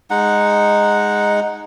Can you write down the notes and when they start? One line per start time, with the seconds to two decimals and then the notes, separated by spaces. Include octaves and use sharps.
0.10 G#3 D#4 F#5